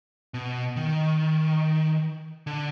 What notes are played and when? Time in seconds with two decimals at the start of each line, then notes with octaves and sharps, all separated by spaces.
0.34 B2
0.76 D#3
2.47 D3